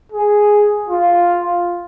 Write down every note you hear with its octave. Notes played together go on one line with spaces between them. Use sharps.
G#4
F4